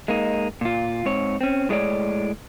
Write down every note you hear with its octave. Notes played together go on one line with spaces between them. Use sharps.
G#3 A#3 D#4
A#2 F4
G#2 C4 C#5
C4 C#4
A2 G#3 A3 C#5 D5